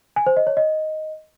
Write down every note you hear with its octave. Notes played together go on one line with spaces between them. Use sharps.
G#5
C5
D#5
C#5
D#5